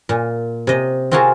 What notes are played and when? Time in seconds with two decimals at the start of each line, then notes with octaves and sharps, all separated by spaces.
0.09 A#2
0.67 C3 D#5
1.11 C4 F4 F#4 G#4 A#4 A5